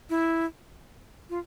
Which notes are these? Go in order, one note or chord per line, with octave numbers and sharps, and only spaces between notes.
E4
F4